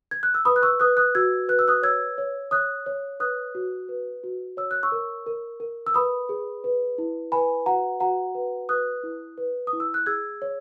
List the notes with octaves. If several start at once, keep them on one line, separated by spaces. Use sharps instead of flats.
G#6
F#6
E6
B4 B5 D#6
F#6
C#6 E6
B4 D#6 F#6
D#6 F#6
F#4 E6 G#6
B4 F#6
E6
D#6 F#6
C#5 E6 G#6
C#5
C#5 D#6 F#6
C#5
B4 D#6 F#6
F#4
B4
F#4
C#5 E6
F#6
C#6 E6
A#4
A#4
A#4
E6
B4 B5 D#6
G#4
B4
E4
B4 G#5 B5
F#4 F#5 A#5
F#4 F#5 A#5
B4
B4 D#6 F#6
E4
B4
D#6
E4
E6
F#6
G#4 E6 G#6
C#5